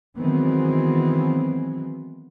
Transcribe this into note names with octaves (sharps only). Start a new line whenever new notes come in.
D#3 E3 F#3 G#3 B3 C4